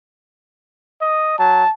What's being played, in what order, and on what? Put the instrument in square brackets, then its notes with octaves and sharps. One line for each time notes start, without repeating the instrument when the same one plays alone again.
[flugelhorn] D#5
[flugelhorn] F#3 [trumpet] A5